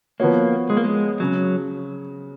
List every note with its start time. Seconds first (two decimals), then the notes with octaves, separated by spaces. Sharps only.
0.20 F3 A#3 B3 F#4 C#5
0.70 G#3
0.77 A#3
0.84 G#3
1.20 C#3 F#3